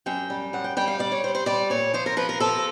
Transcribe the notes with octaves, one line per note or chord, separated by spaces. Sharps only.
F#2 G5
G3
F#2 F#5
G5
G3 G5
F5
G3 D5
C#5
G3 C5
C5
G3 D5
A#2 C#5
F3 C5
A#4
F3 B4
A#4
F3 A4